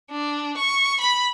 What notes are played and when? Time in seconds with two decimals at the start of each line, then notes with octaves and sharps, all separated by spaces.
0.11 D4
0.57 C#6
1.00 B5